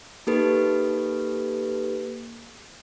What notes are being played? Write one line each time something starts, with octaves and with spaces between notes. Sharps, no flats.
A#3 D#4 G4 A4 B4